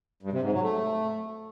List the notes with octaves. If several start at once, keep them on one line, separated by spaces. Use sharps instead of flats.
G2
C3
G#2
F#3
A3